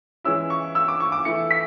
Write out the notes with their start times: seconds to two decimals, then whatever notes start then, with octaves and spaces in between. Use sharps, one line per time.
0.24 E3 G#3 C#4 E4 E6
0.50 C#6
0.75 E6
0.88 D6
1.00 C#6
1.12 D6
1.25 E3 A3 E4 C#7
1.51 B6